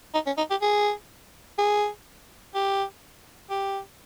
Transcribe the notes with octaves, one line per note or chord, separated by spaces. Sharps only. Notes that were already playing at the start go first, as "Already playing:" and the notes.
D#4
C#4
D#4
G4
G#4
G#4
G4
G4